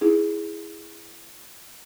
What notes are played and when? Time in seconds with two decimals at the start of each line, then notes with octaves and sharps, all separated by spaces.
0.01 D#4 E4 G#4